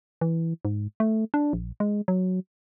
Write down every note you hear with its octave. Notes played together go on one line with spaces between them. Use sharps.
E3
G#2
A3
D4
A#1
G#3
F#3